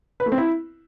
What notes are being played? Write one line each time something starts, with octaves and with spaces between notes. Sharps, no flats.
B4
A3
C4
E4